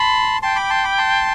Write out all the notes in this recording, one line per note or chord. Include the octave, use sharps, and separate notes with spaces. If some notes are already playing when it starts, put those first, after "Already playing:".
Already playing: A5 B5 C6
G5 A5 C6
B5 D6
A5 C6
B5 D6
A5 C6